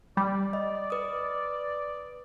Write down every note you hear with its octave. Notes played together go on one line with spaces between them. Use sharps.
G3 D5
D#5
B4 D#6